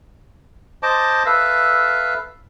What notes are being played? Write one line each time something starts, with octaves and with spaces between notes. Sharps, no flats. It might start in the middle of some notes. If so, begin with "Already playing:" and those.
C5 D#5 A5 D6
A4 B4 E5 F5